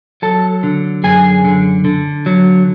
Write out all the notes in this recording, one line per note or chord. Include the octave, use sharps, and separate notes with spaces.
F#3 A4 A5
D3
F#2 G#4 G#5
D3
D3
F#3